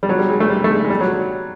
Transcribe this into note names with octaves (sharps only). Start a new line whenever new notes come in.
G3
F#3
G3
G#3
A3
G3
A3
G#3
G#3
G3
F#3